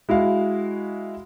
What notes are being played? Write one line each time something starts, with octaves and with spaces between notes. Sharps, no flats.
G#3 E4 F#4 F5